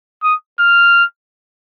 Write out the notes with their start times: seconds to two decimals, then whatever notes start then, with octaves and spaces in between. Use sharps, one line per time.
0.23 D#6
0.59 F6